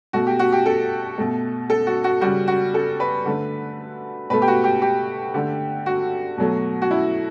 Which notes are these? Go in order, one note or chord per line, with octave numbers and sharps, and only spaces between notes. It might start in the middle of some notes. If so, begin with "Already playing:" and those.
B2 A3 F#4
G4
F#4
G4
A4
B2 A3
A4
F#4
F#4
C#3 G3 F#4
F#4
A4
B4
D3 A3
B2 A3 B4
G4
F#4
G4
G4
D3 A3
F#4
B2 F#3 A3
F#4
E4